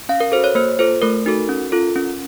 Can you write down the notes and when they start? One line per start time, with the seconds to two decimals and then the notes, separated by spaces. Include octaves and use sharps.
0.09 C#4 F5
0.20 A#4
0.32 F#4 A4 C5
0.44 C#5
0.55 A#3 C5
0.79 F4 A4 C5
1.02 A3 A#4
1.26 D#4 F#4 A4
1.49 C#4
1.72 F4 A4
1.96 C#4